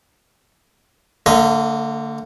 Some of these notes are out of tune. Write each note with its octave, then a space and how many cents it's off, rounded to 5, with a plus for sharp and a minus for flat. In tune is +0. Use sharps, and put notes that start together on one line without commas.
D3 +0 A#3 -45 D#5 +0